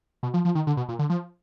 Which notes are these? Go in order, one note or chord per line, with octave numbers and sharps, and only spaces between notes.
B2
F3
F3
D#3
D3
B2
A#2
D3
F3